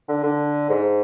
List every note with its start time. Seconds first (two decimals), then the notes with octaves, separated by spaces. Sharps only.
0.08 D3
0.23 D3
0.69 G#2